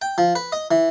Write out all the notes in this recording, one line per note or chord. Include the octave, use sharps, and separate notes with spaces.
G5
F3
B4
D#5
E3